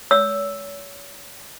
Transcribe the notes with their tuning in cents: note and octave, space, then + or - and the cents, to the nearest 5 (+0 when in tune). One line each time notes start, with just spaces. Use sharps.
C#5 +35 E6 +0